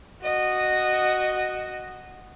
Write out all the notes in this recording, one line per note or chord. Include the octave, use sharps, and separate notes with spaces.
F#4 D#5